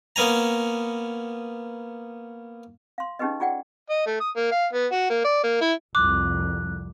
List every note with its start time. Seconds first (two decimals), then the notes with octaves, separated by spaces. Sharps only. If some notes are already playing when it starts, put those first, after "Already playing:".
0.16 A#3 B3 C#4 G#5 A#5
2.98 F5 C6
3.19 C#4 D#4 G4 G#4 B4 D#5
3.40 F4 G#4 D5 F#5 G5
3.90 D#5
4.06 A3
4.20 D#6
4.36 A#3
4.52 F5
4.73 B3
4.92 F#4
5.10 A#3
5.24 D5
5.44 A#3
5.61 E4
5.95 C2 F2 D6 F#6